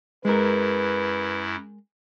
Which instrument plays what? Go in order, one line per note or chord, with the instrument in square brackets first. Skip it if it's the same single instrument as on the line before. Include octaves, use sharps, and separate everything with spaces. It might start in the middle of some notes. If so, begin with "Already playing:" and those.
[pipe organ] F#2 E4 [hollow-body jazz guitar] G#3 A#4 [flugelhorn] B4